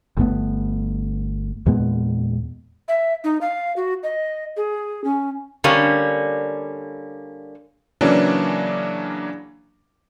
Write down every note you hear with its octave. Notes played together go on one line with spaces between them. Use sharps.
G1 G2 A3 B3
E2 A#2 G#3 B3
E5
D#4
F5
F#4
D#5
G#4
C#4
D3 G3 A#3 C#4
C#3 E3 F#3 A#3 C#4 D4